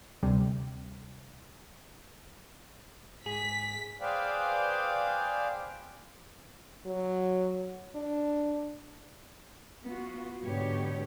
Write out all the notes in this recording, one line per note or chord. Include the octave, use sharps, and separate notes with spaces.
D2 C3 G3
G#2 G#4 B6
G#4 B4 C5 D5 F5 G5
F#3
D4
B3 F4 F#4
G#2 B2 D3 B3 G4 C#5